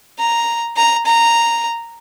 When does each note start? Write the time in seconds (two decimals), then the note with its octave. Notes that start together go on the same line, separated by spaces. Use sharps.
0.19 A#5
0.76 A#5
1.06 A#5